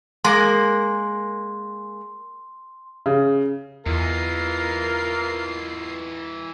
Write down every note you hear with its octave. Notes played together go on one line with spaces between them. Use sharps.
G#3 A#3 A#4 C6
C#3
E2 E3 D#4 F4 A#4 C7